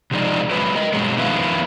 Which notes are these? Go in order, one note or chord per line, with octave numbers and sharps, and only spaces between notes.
C3 F3 G#3 D#4 D5
F#3 G#3 B4
A#4 D#5
G2 B2 F#3 G#3
F2 D#3 B3 E4 F5